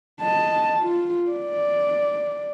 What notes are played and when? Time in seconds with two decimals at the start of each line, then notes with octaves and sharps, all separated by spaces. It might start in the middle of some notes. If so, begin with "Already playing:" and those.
0.21 D#5 A5
0.80 F4
1.31 D5